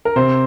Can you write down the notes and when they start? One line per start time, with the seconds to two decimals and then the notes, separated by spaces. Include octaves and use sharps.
0.05 A#4
0.16 C3 C5